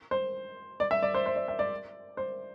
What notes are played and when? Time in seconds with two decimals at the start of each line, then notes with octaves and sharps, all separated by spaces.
0.11 C5
0.80 D5
0.91 E5
1.03 D5
1.14 C5
1.26 C5
1.36 D5
1.48 E5
1.59 D5
2.17 C5